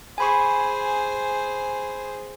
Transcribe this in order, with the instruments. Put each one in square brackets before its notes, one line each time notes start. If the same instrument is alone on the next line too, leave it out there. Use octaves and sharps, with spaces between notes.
[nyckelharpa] G#4 C5 [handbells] G#5 B5 C#6